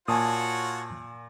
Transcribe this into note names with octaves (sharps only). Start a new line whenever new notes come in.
A#2 F4 F#4 C#5 G#5 A5 D#6